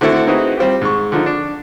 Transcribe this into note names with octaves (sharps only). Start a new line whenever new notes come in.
D3 A3 C4 E4 F#4 A4
C4 D#4 E4 F#4 G#4 B4
G3 C4 F4 G4
G#2 C#6
D3 F3 D#4
D4